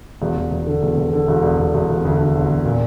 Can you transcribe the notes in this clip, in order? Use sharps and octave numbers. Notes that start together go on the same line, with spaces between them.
E1
E1
E1
D3
E1
E1
D3
E1
E1
E1
E1
E1
D2
D3
E1
E1
A#2